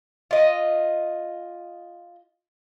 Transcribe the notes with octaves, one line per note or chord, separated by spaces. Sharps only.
F4 D#5